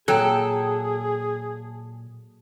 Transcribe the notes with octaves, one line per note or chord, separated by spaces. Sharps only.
A#2 F#3 G#4 A4 G5 G#5